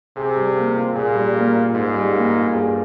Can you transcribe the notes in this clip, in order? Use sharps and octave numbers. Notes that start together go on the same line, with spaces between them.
C3 G#4
G3
A#3
F4
A#2 G#4
G3
A#3
F4
G#2 G#4
G3
A#3
F4
G2 G#4